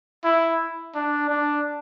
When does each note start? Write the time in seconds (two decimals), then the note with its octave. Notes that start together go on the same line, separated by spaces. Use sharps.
0.24 E4
0.95 D4
1.30 D4